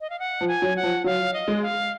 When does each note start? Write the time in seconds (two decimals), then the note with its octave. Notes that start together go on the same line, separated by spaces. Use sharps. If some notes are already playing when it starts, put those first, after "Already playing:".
0.01 D#5
0.10 F5
0.19 F#5
0.41 F3
0.48 G#5
0.62 F#3
0.76 F#5
0.83 F3
1.04 F#3 F5
1.34 D#5
1.48 G#3
1.62 F5